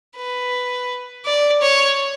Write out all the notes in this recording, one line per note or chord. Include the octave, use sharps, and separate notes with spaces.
B4
D5
C#5